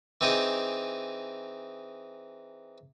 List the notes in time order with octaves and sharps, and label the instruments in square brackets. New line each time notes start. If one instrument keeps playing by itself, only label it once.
[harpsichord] E3 C4 D#4 G#4 D5